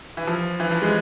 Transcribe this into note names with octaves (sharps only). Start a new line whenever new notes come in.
E3
F3
E3
F3
G#3